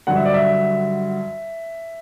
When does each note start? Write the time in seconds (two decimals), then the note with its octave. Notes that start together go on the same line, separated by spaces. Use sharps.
0.07 G2 D3 F#3 F#5
0.16 E5
0.26 D5
0.34 E5